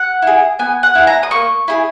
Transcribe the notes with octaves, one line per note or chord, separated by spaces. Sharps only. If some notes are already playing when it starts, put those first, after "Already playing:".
Already playing: F#5
E4 G#4
B3 G#5
F#5
E4 G#4
A#5
D#6
A#3 C#6
E4 G#4